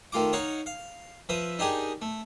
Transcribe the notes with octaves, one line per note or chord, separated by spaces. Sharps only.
D#3 A3 F4 D6
D#4 C#5 F5 F#5
F5
F3 B4 E5 D#6
D4 D#4 G4 G#4 A#4
A3